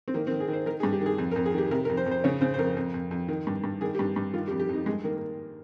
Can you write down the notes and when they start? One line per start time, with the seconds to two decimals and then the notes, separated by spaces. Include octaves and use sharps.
0.08 C4
0.14 D#3 A#3
0.27 C4
0.31 D#3
0.40 G#4
0.48 D#3 C5
0.66 D#3 A#4
0.80 G#4
0.83 G2
0.93 G4
1.01 D#3 G#4
1.18 F2
1.31 A#4
1.36 F2
1.46 G#4
1.54 D#3 G4
1.71 C3 A#4
1.85 A#4
1.89 F2
1.97 C5
2.06 F2
2.11 C5
2.24 C#3 C#5
2.41 C#3 C5
2.54 C5
2.59 F2 A#4
2.77 F2
2.94 F2
3.11 F2
3.28 D#3
3.47 G2
3.64 G2
3.81 D#3 G#4
3.95 G4
3.99 G2
4.16 G2
4.33 D#3 F4
4.48 G4
4.51 F2
4.60 G4
4.69 F2 D#4
4.86 G2 G#3
5.04 D#3 A#3
5.17 A#3